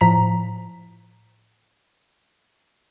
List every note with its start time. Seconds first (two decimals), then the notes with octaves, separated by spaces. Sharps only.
0.01 A2 F3 A#5 B6